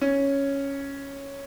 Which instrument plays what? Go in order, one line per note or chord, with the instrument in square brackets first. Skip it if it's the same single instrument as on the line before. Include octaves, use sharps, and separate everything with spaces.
[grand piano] C#4